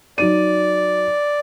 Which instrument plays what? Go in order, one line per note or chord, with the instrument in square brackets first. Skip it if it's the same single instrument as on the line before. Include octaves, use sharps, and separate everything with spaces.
[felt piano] F#3 D#4 D#7 [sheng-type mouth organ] D5